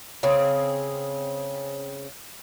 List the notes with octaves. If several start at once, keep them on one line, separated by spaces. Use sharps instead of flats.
C#3 C4 G#4